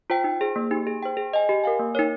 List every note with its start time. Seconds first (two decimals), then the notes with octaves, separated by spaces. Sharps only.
0.10 F4 C5 G5
0.24 D#4
0.41 G#4 C5
0.56 A#3
0.71 D#4 G4
0.87 G#4
1.03 C5 G5
1.17 G#4
1.33 D#5 G#5
1.49 G4
1.64 A#4 F5 G#5
1.79 A#3
1.95 D#4 A#4 C#5